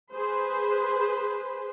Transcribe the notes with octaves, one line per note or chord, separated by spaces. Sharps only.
G#4 B4 C5